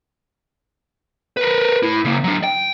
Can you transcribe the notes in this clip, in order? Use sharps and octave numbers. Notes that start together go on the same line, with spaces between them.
A#4 B4
A2 E4
C#3 A#3
F#3 D4
G5